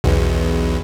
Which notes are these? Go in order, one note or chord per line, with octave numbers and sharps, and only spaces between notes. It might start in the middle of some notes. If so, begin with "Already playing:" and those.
B1 E2